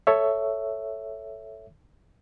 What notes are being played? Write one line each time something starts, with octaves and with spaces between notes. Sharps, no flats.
A4 C#5 E5